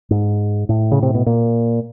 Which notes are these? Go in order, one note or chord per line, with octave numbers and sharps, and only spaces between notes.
G#2
A2
C#3
C3
B2
A#2